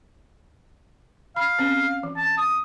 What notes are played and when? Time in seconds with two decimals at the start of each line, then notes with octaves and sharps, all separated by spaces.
1.36 F5 B5
1.59 C4 C#4
2.03 E3
2.17 A5
2.38 D#6